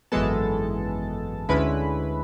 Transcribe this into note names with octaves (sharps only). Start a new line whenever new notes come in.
G#1 F#2 E3 G#3 B3 A4 A5
D2 D3 G#3 C#4 E4 B4 B5